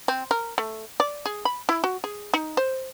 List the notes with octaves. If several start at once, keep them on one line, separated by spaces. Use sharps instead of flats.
C4
A#4
A3
D5
G#4
B5
E4
F#4
G#4
D#4
C5